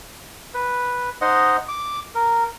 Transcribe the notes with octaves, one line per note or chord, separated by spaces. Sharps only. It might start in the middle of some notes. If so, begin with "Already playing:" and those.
B4
D#4 C5 D#5 F#5
D6
A#4